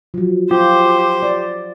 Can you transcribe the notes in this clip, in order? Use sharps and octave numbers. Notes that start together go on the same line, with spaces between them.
F3 F#3
F4 G4 C5
D5